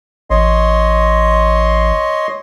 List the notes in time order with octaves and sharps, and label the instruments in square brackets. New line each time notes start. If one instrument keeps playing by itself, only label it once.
[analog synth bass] A1 [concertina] C#5 D#5 C6